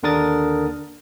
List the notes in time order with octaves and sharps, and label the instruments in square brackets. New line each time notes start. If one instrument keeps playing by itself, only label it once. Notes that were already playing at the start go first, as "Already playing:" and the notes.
[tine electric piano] D#2 D3 D4 A#4 D#6 A6